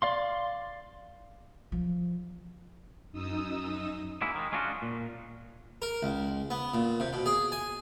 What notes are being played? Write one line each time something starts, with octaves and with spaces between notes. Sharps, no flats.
D5 F5 C6
F3
F#2 D#4 D#6 E6
F#3 G#3 A#3 E4
D#3 G#3
G#3 C#4 D4 F4 F#4
A#2
A#4
C#2
B3
A#2
C3
B2
G#4
G#5